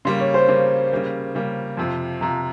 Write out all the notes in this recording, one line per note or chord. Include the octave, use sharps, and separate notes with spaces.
C#3 G3 A#3 C6
C#5
C5
C#3 G3 A#3
C#3 G3 A#3
C#3 G3 A#3
F2 C3 F3
F2 C3 F3 A#5